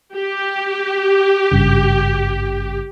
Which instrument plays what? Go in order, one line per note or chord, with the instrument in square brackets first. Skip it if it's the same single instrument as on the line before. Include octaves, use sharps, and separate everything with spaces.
[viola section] G4
[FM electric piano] G#1 G2 C#3